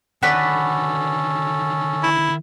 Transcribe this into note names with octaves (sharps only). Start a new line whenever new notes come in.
D3 D#3 C#4 F#4 A4 B4 D5
E4